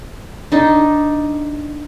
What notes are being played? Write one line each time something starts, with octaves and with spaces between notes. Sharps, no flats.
D4 D#4